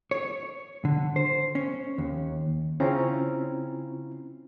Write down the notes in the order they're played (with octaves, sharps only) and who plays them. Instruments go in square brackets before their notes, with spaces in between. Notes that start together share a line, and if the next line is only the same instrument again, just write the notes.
[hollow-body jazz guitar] C#5
D3
C5
C#4
D#2
[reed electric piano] C#3 C4 C#4 E4 F4 A#5